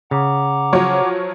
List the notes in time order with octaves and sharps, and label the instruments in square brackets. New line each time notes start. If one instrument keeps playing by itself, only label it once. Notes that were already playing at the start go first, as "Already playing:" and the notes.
[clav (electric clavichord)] C#3 [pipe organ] F#5 A#5 D6
[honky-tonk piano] F3 F#3 C#5